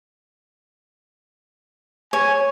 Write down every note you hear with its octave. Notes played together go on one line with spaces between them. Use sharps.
C#5 G#5